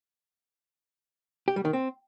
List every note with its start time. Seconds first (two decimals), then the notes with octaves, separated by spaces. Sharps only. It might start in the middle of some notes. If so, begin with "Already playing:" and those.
1.48 G4
1.56 G3
1.65 D#3
1.73 C4